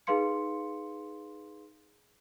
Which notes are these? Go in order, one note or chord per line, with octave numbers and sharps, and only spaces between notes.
D#4 G#4 B4 F5 C6 C#7